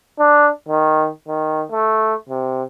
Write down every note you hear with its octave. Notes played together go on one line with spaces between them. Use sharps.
D4
D#3
D#3
A3
C3